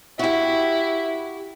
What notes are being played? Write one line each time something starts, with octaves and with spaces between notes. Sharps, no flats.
E4 F#4 G4